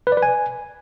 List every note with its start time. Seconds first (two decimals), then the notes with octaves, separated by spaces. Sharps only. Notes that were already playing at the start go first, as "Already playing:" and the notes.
0.07 B4
0.12 D5
0.17 B4
0.22 G#5